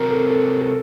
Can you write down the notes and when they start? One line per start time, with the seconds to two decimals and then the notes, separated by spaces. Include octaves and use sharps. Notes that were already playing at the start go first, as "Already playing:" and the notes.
Already playing: C3 F#3 C4 A#4
0.10 A4
0.30 A4
0.61 A4